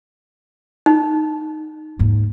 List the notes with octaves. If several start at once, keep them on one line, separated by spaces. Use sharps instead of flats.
D#4
D#2 G#2